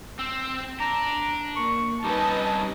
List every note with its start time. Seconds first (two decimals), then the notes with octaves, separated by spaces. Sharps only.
0.19 C4 E6
0.80 D4 A#5
1.56 A#3 C#6
2.04 G3 C4 C#4 D#4 B4 D#5 A5